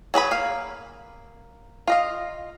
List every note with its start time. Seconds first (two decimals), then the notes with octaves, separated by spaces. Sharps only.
0.14 F#3 G#4 B4 B5
0.31 A#3 F5
1.88 F4 D#5 F5